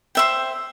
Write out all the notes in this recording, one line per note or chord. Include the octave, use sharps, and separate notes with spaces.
C5 E5 G5